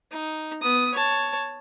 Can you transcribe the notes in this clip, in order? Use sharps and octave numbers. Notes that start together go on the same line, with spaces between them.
D#4
B3 D#6
C#5 A5